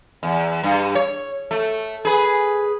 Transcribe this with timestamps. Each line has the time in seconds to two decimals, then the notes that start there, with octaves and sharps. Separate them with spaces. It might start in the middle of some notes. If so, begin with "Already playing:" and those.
0.23 E2
0.63 G2
0.95 C#5
1.51 A3
2.05 G#4 B4